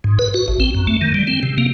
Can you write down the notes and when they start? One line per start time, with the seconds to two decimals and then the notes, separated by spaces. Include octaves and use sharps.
0.04 G#2
0.19 B4
0.34 F#4
0.48 A1
0.60 C4
0.75 F#2
0.87 A3
1.01 D#3
1.14 G3
1.27 C4
1.43 C3
1.58 A#3